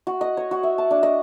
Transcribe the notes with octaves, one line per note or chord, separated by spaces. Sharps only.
F#4
D#5
C#5
F#4
E5
A5
D4
D#5